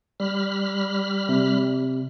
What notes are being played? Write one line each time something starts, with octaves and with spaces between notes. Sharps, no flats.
G3 B5 F6
C3